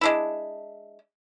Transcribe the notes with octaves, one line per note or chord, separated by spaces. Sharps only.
G#3 D4 E4